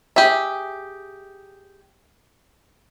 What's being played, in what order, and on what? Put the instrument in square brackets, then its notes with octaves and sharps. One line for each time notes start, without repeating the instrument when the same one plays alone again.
[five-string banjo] G4 G#4 E5